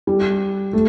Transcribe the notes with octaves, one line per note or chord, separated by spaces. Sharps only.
G3
A3